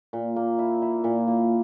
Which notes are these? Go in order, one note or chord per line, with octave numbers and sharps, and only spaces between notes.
A#2
A#3
E4
E4
A#2
A#3